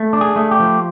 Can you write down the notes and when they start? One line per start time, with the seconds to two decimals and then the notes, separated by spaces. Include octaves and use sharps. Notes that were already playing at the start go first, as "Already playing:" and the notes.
Already playing: A3
0.13 D4
0.21 G#4
0.36 A3
0.51 G4
0.60 F3